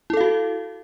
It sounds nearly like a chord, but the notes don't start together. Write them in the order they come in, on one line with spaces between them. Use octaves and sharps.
E4 A4 F5 F#4